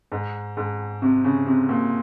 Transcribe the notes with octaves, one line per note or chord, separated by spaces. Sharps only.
G#2
G#2
C3
C#3
C3
A#2